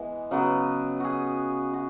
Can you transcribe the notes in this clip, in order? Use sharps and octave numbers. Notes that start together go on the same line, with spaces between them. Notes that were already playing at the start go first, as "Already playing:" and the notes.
Already playing: E3 G#3 B3
C#3 F#3 B3
F#4 G#4
F#4